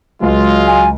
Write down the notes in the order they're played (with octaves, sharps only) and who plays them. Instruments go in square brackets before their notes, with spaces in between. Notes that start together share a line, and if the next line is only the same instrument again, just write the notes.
[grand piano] C#2 [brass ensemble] F#3 G#3 F4
[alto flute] G#5